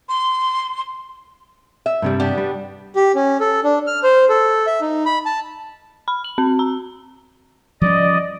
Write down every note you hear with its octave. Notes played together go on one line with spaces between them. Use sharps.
C6
E5
G2 C3 G3
B3 D4 G4
G3
G4
C#4
A4
D4
F6
C5
A4
E5
D#4
B5
A5
B5
F#7
C4
A#5
F3 G3 C#4 D5 D#5